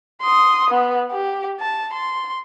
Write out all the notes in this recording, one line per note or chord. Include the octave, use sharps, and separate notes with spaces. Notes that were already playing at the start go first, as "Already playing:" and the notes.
C6 D#6
B3
G4
A5
C6